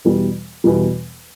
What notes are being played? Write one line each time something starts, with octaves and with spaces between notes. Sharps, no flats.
E2 B2 G3
E2 B2 G3